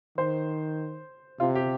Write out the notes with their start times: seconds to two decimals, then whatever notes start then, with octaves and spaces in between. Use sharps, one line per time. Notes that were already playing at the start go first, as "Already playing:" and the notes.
0.18 D#3 C5
1.40 C3 F4
1.55 G4